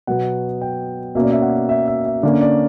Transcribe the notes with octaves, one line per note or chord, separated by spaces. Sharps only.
B2 F#3 B3 F#5
G5
B2 A#3 C#4 E5
D5
E5
F#5
E5
E5
E5
D3 A#3 C#4 D5
D5